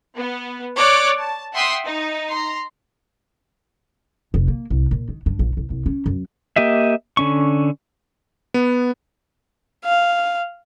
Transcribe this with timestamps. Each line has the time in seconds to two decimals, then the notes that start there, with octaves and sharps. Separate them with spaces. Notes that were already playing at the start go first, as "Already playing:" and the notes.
0.16 B3
0.76 C#5 D5 D6 F#6 D7
1.19 A5
1.53 E5 F#5 G5 C6 D#6 B6
1.84 D#4
2.30 A#5 C6
4.34 F1
4.48 A#3
4.70 C2
4.91 A#2
5.09 D#3
5.26 G2
5.39 A#1
5.57 C2
5.70 C2
5.86 C#4
6.06 F#2
6.56 A#3 G4 D#5 E5
7.17 D3 C#4 C#6
8.54 B3
9.85 F5